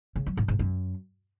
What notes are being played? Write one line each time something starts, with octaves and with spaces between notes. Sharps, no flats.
C#3
F#3
A2
G#2
F#2